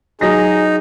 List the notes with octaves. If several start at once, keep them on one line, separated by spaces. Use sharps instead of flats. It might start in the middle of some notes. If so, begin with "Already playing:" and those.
F#3 D#4 G#4 D#5 A#6